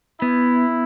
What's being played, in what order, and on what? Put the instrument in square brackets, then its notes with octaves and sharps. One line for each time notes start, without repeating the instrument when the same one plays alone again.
[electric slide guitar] B3 [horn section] E4